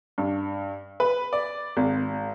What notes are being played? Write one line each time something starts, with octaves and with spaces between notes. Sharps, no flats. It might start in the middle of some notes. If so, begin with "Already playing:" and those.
G2
B4
D5
G#1